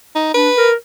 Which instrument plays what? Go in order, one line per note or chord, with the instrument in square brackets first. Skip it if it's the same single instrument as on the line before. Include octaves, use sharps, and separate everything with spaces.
[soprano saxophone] D#4
[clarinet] D4 [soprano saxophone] B4
[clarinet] A#4